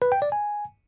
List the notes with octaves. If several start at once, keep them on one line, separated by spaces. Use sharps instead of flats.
B4
G5
D5
G#5